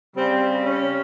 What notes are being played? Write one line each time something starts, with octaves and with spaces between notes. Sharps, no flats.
C#3 G3 C4
C#4